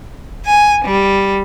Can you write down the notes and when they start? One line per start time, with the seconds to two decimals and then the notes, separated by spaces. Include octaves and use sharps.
0.45 G#5
0.85 G3